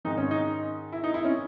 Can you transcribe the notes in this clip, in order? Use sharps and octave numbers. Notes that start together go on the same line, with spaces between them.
G#2 D#3 D#4
C#4
D#4
E4
D#4
E4
C#4